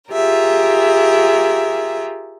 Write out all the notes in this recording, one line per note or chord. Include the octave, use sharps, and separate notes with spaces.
F4 G4 G#4 A#4 E5